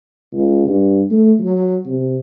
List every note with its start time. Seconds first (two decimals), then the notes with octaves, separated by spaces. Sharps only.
0.33 C#2
0.67 G2
1.10 A3
1.40 F#3
1.85 C3